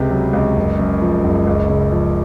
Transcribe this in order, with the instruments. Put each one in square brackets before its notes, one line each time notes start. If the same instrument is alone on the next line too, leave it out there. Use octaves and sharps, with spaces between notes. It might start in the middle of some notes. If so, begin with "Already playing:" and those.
Already playing: [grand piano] C#2 C3
F#3
C#2
F#1
F#2
F3
F#1
C#2
C#3
F3